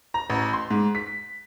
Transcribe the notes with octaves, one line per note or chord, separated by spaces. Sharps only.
A#5
A1
C6
G#2
B6